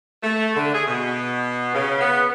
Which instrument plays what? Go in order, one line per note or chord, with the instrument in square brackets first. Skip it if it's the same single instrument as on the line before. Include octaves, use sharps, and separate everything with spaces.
[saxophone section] A3
D3
G#4
B2
C#3
B3